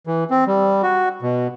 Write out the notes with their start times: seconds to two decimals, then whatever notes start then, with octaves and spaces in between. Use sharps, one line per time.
0.07 E3
0.31 C4
0.47 G3
0.83 F#4
1.22 B2